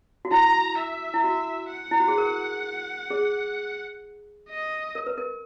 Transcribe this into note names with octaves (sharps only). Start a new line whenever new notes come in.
F#4
E4 A#5
E5
E4
F#4 E5
F#5
E4
F#4
G#4
A#4
G#4
D#5
A#4
B4
A#4